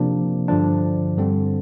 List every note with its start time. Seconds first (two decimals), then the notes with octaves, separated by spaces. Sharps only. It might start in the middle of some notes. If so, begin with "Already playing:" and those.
Already playing: C3 F3 A#3 D4
0.48 G2 D3 F3 D4
1.17 G2 D3 G3 C4